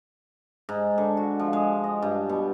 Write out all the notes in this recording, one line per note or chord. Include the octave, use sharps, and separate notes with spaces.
G#2
D3
F#4
F3
G#3
D#5
G2
B2